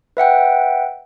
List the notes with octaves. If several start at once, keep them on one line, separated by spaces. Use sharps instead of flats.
B4 E5 F#5 G5